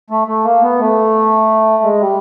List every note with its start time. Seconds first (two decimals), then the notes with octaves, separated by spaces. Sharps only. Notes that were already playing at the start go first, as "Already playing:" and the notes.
0.10 A3
0.27 A3
0.45 A#3
0.62 B3
0.80 A3
1.84 G#3
2.00 G3